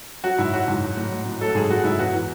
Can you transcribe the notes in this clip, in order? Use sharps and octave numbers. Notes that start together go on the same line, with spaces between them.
F#3 F#4
G#2 E4
F#3 F#4
G#2
F#3
A2
F#3
A2
F#3 A4
G#2 G#4
F#3 F#4
G#2 E4
E2 F#4
E3